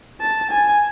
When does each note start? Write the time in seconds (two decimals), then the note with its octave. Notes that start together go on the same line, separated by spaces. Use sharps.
0.21 A5
0.51 G#5